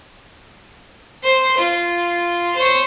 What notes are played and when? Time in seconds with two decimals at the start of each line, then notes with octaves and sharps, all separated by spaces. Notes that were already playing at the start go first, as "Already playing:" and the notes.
1.24 C5
1.58 F4
2.56 C5 C#5